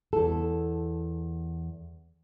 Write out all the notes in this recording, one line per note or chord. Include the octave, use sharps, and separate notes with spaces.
E2 A4